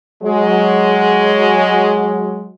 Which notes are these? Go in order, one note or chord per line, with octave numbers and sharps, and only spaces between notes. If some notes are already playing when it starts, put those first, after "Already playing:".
F#3 G#3